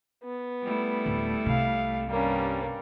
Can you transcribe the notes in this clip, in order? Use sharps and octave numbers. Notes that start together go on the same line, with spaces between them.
B3
G3 A3 E4
D1
C2 C3 F5
G2 G3 A#3 C#4